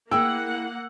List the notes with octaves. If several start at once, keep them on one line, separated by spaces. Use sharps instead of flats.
A#3 E4 G#4 F#5 G5 E6